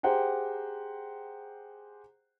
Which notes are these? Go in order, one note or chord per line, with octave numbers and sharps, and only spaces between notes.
G4 G#4 C5 F#5 G5 A#5